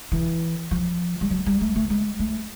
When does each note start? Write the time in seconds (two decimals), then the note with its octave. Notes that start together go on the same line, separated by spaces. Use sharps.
0.12 E3
0.71 F3
1.21 G3
1.30 F#3
1.46 G3
1.61 A3
1.76 A3
1.90 G#3
2.19 A3